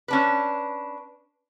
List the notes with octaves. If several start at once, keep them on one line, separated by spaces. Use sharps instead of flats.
C#4 D4 B4